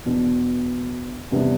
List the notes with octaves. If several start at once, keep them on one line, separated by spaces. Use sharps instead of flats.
E2 B2 B3 D4
E2 C3 G3 B3 D4